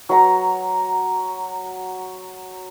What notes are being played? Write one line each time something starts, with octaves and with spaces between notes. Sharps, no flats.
F#3 A#5